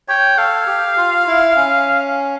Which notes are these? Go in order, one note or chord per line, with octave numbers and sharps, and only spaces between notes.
C#5 G5
A4 F5
G4
F4
E4
C#4